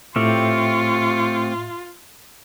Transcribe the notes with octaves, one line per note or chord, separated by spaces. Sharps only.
A2 A3 C4 F4 G4 E5 C#6 F6